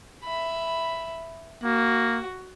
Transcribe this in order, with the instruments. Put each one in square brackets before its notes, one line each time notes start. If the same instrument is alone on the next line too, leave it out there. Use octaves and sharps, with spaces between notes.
[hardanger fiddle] E5 B5
[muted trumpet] A#3 [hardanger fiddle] F#4